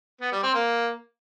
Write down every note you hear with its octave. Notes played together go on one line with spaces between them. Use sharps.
B3
G3
C4
A#3